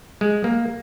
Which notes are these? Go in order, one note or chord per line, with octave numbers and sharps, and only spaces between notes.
G#3
A#3